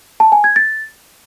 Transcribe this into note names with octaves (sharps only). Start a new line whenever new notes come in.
A5
G#5
G#6
A6